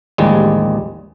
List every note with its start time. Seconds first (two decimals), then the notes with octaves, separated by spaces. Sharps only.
0.18 A1 D#2 F3 G3 G#3